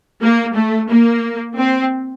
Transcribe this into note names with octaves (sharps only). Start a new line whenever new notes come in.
A#3
A3
A#3
C4